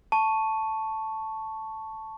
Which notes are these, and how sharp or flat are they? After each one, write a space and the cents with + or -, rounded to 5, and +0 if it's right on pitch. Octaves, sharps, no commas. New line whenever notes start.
A5 +0 C#6 +0